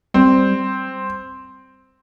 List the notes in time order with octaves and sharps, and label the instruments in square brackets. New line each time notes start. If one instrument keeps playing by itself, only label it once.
[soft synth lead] G3 [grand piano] C4